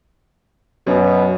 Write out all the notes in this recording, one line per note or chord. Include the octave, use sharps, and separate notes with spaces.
F#2 B2